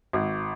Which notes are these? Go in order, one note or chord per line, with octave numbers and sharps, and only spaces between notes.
G#1